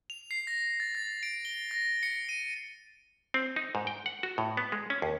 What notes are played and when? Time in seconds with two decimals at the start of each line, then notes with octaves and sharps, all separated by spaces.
0.10 F7
0.31 C7
0.47 A#6
0.80 A6
0.95 A6
1.23 D7
1.45 G7
1.71 A#6
2.03 C#7
2.29 D#7
3.34 C4
3.56 D#4
3.75 G#2
3.87 G5
4.06 F#5
4.23 F#4
4.38 A2
4.57 B3
4.72 G#3
4.90 C#4
5.02 D#2